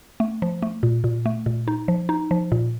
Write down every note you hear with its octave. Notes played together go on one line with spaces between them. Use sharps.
A3
F3
A3
A#2
A#2
A3
A#2
D#4
F3
D#4
F3
A#2